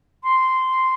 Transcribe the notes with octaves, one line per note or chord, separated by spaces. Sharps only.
C6